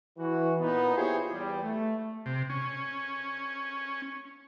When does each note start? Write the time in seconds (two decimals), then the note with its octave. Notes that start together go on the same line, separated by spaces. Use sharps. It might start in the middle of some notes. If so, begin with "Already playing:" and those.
0.17 E3 F#4
0.60 A#2 B3 D#4
0.95 E4 F4 G4 G#4 C5 C#5
1.30 E2 G3
1.61 A3
2.26 C3
2.50 C#4